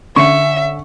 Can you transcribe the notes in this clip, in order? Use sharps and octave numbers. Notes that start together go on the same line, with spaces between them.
D3 C#4 E5 C#6